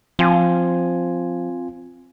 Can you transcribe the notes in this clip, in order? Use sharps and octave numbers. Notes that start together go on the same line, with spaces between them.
F3 C4 F4 G#5